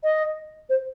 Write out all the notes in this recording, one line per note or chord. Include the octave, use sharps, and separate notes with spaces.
D#5
C5